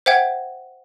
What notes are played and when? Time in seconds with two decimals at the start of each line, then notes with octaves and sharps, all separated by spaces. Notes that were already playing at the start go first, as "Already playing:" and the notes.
0.06 C5 E5 F#5 G5 G#6